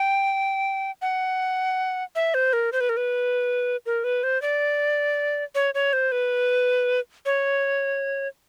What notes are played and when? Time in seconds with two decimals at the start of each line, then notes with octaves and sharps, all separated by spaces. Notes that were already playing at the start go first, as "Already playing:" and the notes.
Already playing: G5
1.02 F#5
2.16 E5
2.34 C5
2.53 A#4
2.73 C5
2.81 B4
2.89 A#4
2.97 B4
3.86 A#4
4.04 B4
4.23 C5
4.42 D5
5.55 C#5
5.74 C#5
5.93 C5
6.12 B4
7.26 C#5